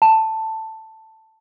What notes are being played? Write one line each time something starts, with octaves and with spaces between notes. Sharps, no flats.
A5